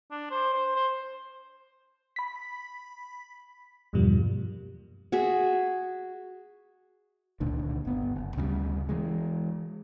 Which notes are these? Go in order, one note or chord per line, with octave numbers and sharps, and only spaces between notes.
D4
C5
C5
C5
B5 B6
E2 G2 B2 F3 G3 A#3
F#4 G#4 E5
C#2 A#2 D3 D#3
G1 B3
F#1
D2 C#3 E3 G3
E3 G#3